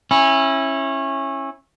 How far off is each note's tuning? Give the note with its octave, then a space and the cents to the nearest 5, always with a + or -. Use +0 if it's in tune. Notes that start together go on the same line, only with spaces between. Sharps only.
C#4 -25 E4 +0